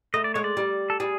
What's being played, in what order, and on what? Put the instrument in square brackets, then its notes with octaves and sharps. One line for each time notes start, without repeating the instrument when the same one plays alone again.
[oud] A3 [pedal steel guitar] D#5
[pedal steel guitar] D5
[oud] G#3 [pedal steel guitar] C#5
[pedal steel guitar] D5
[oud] G3
[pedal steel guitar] A4
[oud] G3 [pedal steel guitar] G#4